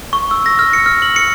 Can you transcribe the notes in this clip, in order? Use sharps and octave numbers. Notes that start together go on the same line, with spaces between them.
C#6
E6
A#6
F6
C#7
F6
F#7
C#7